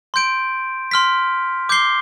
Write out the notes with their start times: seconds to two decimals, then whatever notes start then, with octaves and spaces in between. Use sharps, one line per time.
0.14 C6 G6 D7
0.91 C6 F6 B6
1.69 D6 G6 C7 G7